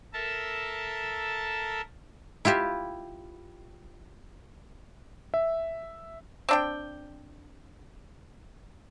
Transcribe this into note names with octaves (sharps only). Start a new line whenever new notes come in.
A4 A#4 E5 A5
E4 F4 G4 E5
E5
C4 D4 G5